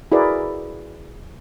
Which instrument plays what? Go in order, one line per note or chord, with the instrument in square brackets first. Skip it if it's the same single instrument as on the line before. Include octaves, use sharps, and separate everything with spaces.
[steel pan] E4 F#4 G#4 A#4 B4 D5